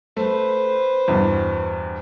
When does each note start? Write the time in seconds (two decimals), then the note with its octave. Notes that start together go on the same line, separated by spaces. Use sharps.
0.17 A3 B4 C5
1.08 E2 G2 B2